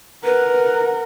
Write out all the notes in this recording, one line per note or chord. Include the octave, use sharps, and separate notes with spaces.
A#4 B4 F#5